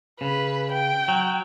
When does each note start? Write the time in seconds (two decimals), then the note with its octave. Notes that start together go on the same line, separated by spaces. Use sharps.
0.21 C#3 B4
0.73 G5
1.08 F#3